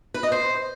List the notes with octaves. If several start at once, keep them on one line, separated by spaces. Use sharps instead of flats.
B4
D#5
C5